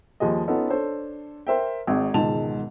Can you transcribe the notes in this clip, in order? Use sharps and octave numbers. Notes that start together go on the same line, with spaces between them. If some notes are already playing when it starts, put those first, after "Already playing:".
D#2 F3 G3 G#4 D#5
B3 C#4 D#4 F4 A4
D4 A4 C5 C#5
A#4 C5 E5 G5
G#1 G#2
E1 C#2 G#2 D#3 A5 F7